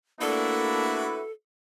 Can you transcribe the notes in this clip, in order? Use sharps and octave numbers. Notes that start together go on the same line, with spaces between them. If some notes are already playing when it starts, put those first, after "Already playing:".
A3 A#3 D4 E4 F#4 A4 B4 E5